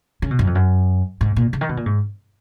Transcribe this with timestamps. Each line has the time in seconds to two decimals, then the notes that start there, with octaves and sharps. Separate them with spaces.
0.22 C#3
0.31 B2
0.39 F#2
0.47 F2
0.55 F#2
1.21 G#2
1.36 A#2
1.53 C#3
1.61 D#3
1.69 B2
1.77 A#2
1.86 G#2